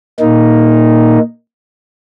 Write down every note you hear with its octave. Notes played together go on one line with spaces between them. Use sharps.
A#2 A#3 D#4